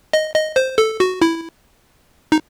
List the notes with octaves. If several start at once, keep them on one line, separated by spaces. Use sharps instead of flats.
D#5
D#5
C5
A4
F#4
E4
D#4